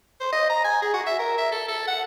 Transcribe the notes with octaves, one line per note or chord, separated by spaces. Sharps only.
C5
D#5
A#5
G#5
G#4
F#4
E5
A#4
E5
A4
A4
F#5